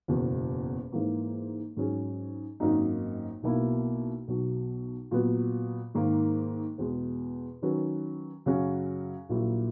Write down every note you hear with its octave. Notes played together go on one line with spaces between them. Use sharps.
F#1 E2 B2
G#2 E3 A#3
G#2 F#3 C#4 G#4
G#1 F#2 D#3 A#3 D#4
B1 B2 A#3 E4
B1 B2 F#3
A#2 F#3 B3 F#4
G#2 D#3 A#3
E2 B2 G#3
D#3 F#3 C#4 F#4 B4
F#2 C#3 F#3 C#4 F#4
A#1 A#2 F#3 A#3 E4